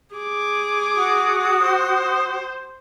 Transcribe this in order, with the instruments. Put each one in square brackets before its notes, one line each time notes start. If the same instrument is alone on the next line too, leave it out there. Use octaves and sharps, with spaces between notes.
[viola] G#4 D6
[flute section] F#4 D#6
[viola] C5